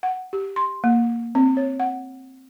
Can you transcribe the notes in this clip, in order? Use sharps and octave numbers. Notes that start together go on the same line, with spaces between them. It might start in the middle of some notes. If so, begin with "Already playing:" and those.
F#5
G4
C6
A#3
C4
C#5
F#5